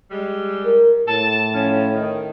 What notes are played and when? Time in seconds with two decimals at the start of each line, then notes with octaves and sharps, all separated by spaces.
0.11 G3 G#3
0.66 A#4
1.08 A2 A5
1.54 F3 C#4
1.94 D#3